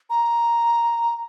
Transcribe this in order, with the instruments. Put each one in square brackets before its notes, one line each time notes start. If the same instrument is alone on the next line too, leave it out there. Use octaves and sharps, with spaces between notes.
[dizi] A#5